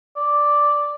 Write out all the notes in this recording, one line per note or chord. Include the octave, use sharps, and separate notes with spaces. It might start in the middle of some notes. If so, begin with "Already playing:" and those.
D5